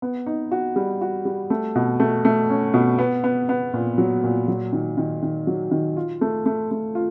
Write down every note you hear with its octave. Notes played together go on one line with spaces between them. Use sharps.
B3
D#4
F#4
G3
F#4
G3
A3
B2
A3
A3
C#4
B2
B3
B3
B3
A#2
F#3
A#2
F#3
D#3
D#3
D#3
F#3
D#3
F4
A3
A3
A3
F4